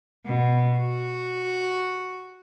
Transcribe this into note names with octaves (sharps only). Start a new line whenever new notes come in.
B2
F#4